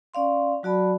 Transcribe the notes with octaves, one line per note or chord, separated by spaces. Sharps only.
C#4 D5 F5 C6
F#3 F#4 D5 A5 B5